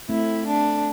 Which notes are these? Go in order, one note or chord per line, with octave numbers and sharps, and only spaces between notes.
A3 C4 E4
D4